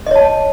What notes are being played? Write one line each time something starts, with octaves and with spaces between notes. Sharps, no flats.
C#5 D#5 A5